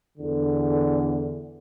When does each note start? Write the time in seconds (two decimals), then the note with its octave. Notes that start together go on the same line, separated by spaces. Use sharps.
0.18 E2 D3